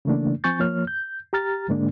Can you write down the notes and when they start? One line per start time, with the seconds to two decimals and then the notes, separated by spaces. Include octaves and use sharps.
0.05 C#3 E3 A3 A#3 D4
0.44 F3 C4 G#5 C#6 G6 A6
0.59 F3 A#3 C#5 F6
0.87 G6
1.33 G4 A#5 F6 A6
1.68 G#2 D3 G#3 A#3 D4